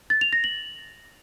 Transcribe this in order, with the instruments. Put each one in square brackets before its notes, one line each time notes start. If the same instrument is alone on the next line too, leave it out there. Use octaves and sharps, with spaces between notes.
[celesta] A6
F7
A#6
F#7